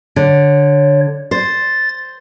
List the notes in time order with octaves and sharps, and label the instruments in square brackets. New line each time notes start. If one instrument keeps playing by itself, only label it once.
[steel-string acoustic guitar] D3 [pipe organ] C#5
[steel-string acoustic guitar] C5 [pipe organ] A6